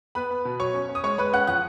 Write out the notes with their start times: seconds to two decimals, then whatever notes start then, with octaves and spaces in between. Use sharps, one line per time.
0.15 B3 B4 B5
0.30 B3
0.45 B2
0.60 F#3 C#5 C#6
0.74 C#4
0.89 C#4
0.95 D#6
1.03 G#3 C#5 C#6
1.18 G#3 B4 B5
1.33 C#4 F#5 F#6
1.47 F3 F#5 F#6